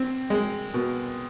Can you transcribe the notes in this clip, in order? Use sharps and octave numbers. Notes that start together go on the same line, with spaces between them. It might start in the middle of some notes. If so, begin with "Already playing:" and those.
Already playing: C4
G#3
B2